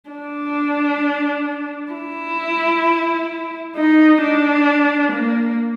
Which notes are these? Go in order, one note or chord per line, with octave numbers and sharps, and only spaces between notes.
D4
E4
D#4
D4
A#3